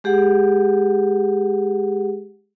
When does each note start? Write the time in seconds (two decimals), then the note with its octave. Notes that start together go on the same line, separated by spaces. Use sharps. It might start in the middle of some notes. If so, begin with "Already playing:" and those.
0.04 G#3 G4 G#4 F#5